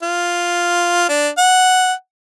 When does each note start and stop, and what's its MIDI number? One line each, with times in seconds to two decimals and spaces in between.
0.03 1.09 65
1.09 1.29 62
1.38 1.93 78